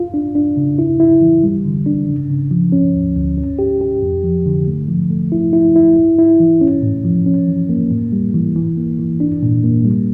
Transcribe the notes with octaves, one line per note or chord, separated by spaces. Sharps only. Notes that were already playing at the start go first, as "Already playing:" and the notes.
Already playing: F4
D4
D4
C#3
E4
E4
E3
G3
D3
D4
C#3
C#3
F3
C#4
D2
D2
C#4
G4
G4
F2
F3
D3
A3
F3
A3
E4
E4
E4
E4
E4
E3
C#4
A2
F3
C#4
E3
A#3
A2
G3
E3
E3
A#3
E3
D4
A#2
A#3
G3